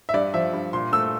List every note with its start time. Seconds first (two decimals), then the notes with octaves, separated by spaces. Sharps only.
0.09 E5
0.14 G2 D5
0.34 F3 E5
0.53 G2
0.73 A#2 C6
0.93 A3 E6